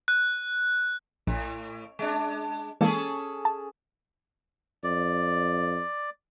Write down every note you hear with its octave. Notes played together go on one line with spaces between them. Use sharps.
F#6
A#1 A2
G#3 D4
E3 G#3 A#3 C#4 G#4 A4
A5
F2 D5